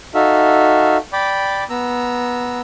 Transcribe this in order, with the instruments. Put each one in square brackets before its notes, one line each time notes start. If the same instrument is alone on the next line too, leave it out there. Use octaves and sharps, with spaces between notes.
[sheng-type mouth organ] D#4 F#4 A4 E5 F5
D5 G5 B5 D6
B3 A#5 E6